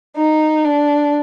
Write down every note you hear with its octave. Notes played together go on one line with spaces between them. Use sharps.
D#4
D4